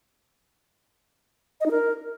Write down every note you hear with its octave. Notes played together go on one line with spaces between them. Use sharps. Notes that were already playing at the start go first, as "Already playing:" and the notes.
D#5
D#4
A#4